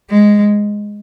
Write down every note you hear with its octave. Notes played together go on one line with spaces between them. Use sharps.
G#3